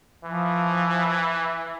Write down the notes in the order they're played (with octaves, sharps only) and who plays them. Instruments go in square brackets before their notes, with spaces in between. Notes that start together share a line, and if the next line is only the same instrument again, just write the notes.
[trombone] E3 [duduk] F3